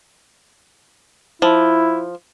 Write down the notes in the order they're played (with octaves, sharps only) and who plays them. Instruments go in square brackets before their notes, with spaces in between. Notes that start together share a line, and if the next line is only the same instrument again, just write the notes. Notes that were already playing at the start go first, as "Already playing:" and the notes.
[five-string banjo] F3 [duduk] E4